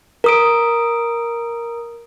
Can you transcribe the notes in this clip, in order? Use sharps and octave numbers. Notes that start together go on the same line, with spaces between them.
A#4 D#6 D7